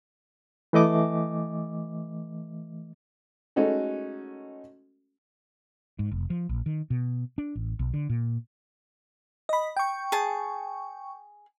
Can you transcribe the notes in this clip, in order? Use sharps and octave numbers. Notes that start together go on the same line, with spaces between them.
E3 A3 D#5 D6
G#3 A3 C#4 D#4 F#4 A4
G#2
F1
F3
A#1
D#3
B2
D4
A1
B1
D3
A#2
D#5 B5
G5 C#6
G#4 A5